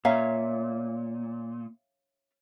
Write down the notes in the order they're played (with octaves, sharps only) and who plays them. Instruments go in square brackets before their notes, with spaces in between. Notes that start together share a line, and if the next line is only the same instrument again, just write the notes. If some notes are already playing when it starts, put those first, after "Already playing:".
[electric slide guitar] A#2 [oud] C#4 [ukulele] E5 F5 A#5